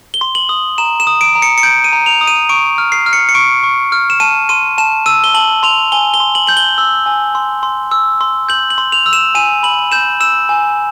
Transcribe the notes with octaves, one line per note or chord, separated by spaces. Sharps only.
G7
C6
F#7
D#6
A#5 E7
E7
D#6
D7
A#5
C#7
C#7
G6 D7
D#7
A#5
F7
D#6
D#7
C#6 D7
F6
C7
F6
C#7
C#7
C#6 D7
C#6
F6
E7
A5 D#7
C6 D#7
A5 E7
E6 D#7
G7
A5 F#7
C6 F7
G#5 G7
G7
C6
F#7
G6 F#7
G7
E6
G#5
C6
C6
E6
C6
G6 F#7
F#7
C6
F7
E6
E7
G#5 D#7
B5 F#7
G6 E7
E6 E7
G#5